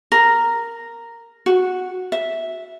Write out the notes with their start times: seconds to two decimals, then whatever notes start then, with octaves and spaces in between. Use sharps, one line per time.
0.12 A#4
1.46 F#4
2.12 E5